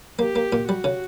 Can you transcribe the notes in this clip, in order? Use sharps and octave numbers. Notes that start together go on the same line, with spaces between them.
A#3 G4
A#3
A#2
G3 F#4
C#3